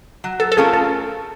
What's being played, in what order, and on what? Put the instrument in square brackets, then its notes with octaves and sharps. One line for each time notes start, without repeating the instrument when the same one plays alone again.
[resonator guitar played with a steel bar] F#3
[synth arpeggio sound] A4
A4
[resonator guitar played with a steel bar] A3 C#4 F4 A#4 [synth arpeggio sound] G#4
[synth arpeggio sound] A4